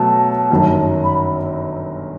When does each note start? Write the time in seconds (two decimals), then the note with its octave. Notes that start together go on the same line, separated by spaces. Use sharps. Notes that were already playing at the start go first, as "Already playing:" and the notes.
Already playing: B2 F#3 A3 A5
0.50 G1 F#2 D#3 F#3
1.04 B5